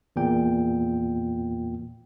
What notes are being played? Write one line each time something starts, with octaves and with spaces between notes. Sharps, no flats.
E2 A#2 G5